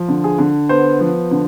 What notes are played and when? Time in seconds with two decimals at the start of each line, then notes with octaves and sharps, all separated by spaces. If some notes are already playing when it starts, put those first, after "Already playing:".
Already playing: F3
0.09 D3
0.24 G#4
0.39 D3
0.69 B3 C5
1.01 F3
1.31 D3